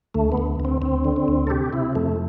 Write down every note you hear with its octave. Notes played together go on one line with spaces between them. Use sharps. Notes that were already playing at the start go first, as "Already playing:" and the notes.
D2 A3
B3
D2
D2
C4
D2 C4
D3
C4
D2
A4
C3 G4
C3 E4
F2 A3